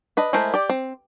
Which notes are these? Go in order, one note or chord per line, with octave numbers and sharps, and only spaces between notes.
D4 B4 D#5
G#3 A3 E4 A#4 C5
G4 D5
C4